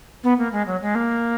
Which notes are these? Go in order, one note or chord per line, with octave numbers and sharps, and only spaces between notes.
B3
A#3
G#3
F#3
G#3
A#3